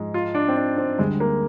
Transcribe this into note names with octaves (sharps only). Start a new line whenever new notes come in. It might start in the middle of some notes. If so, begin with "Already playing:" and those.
Already playing: G#2 F3 G#3
F4
D4
C4
D4
C4
D2 D3 G3 G#3
A#3